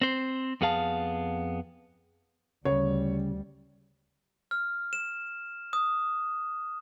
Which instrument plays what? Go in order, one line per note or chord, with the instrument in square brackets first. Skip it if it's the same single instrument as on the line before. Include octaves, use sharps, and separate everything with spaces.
[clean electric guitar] C4 C5
F2 B3 G#4 F5 A5
[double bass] D2 G3 [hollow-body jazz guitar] C#3 [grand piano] C#5
[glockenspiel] F6
E7
D#6